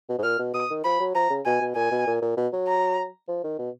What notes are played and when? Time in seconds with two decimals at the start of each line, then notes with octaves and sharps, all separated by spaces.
0.09 B2
0.18 G#2
0.23 A#2 F6
0.39 B2
0.54 B2 D#6
0.70 D#3
0.84 F3 B5
1.00 F#3
1.15 F3 A#5
1.30 C#3
1.45 B2 G#5
1.61 B2
1.76 A#2 G#5
1.91 B2
2.07 A#2
2.22 A#2
2.37 B2
2.53 F#3
2.68 A#5
3.28 F3
3.44 D#3
3.59 B2